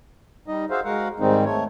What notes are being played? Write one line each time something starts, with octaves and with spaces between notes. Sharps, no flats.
G3 D#4 D#5
F#4 G#4 C5 E5 F5
G#3 F#4 A#4 F5 F#5
G#2 D#3 G3 G#3 C4 D#4
A3 C#5